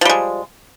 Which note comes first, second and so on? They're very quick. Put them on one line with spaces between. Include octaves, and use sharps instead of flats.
F3 G3 G#3